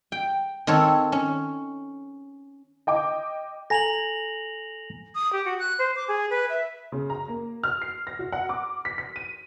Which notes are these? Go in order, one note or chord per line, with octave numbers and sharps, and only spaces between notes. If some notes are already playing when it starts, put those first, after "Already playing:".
G5
D#3 C4 A4 C#5
C#4
D#5 G5 D6
A4 G#5 A#5 A#6 F7 F#7
D#6
G4
F#4
F#6
C5
D6
G#4
B4
E5
C#3
A#5
A#3
F6
C7
A#6
F#4
F#5
D6
B6
B6
D#7